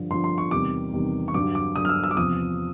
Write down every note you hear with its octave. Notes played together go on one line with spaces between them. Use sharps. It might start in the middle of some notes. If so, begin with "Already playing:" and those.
Already playing: G2 D3 F3
G2 D3 F3 C6
C6
C#6
E2 C3 D#3 G3 D6
E2 C3 D#3 G3
C#6
G2 D3 F#3 D6
D6
G2 D3 F#3 D#6
F6
E6
E6
D6
E2 C3 F3 D#6